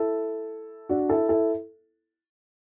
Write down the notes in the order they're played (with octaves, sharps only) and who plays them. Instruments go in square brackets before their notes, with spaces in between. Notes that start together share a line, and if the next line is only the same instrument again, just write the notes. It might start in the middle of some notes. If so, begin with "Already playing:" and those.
Already playing: [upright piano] E4 A4
D4 F#4
E4 A4
E4 A4